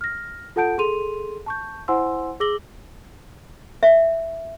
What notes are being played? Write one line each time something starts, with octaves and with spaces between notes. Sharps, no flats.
F6 A#6
F4 A4 F#5 A5 G6 D7
G#4 A4 C6 D#7 F7
A5 C#6 G6
E4 C5 F#5 G#5 C6 E6
G#4 D6 E6 A#6 F#7 G7
E5